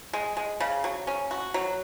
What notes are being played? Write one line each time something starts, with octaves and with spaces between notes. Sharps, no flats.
G#3
G#3
C#3
F#3
C#4
F#4
F#3